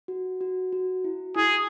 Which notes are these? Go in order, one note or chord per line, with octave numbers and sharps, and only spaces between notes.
F#4
F#4
F#4
E4
E4 G#4